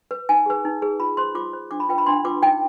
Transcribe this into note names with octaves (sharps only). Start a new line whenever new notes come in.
B4
D#4 G#5
G#4 B4
D#4
G#4 B4
F4 B5
C5 C6
F4 D6
C5
D4 D6
B5
F4 B4 G5
B5
D4 C6
F4 B4 D6
D#4 G5